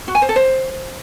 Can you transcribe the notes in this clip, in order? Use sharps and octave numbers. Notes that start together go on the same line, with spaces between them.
F#4
G#5
C5
A4
C5